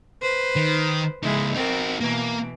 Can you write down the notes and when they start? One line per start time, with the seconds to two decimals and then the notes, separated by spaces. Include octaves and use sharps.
0.21 B4 C5
0.56 D#3
1.23 C#2 G#3 D#4 E4
1.55 C4 D#4 F#4 A#4
2.00 B2 E3 A#3